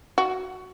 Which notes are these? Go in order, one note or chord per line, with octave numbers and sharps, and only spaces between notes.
F#4